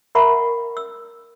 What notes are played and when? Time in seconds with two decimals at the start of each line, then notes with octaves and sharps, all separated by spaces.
0.15 A#4 E5 F#5 A#5 B5 C#6
0.77 E6